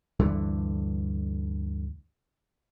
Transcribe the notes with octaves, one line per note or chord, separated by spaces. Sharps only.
D2 G2 D3 E3